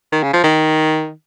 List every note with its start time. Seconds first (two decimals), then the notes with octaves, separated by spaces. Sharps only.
0.12 D#3
0.23 C#3
0.33 F3
0.44 D#3